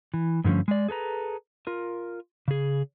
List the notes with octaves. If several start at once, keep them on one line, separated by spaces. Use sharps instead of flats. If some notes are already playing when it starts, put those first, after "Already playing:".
E3
G2 D3 F3 A3 C#4
G#3 D5
G#4 A4 B4 A#5
F4 A#4
C#3 G#4